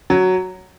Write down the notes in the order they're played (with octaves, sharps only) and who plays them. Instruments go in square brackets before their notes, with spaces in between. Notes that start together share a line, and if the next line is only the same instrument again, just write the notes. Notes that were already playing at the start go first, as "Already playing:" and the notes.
[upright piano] F#3